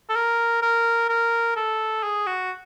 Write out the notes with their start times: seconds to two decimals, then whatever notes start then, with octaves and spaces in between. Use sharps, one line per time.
0.10 A4
0.16 A#4
0.62 A#4
1.09 A#4
1.56 A4
2.03 G#4
2.27 F#4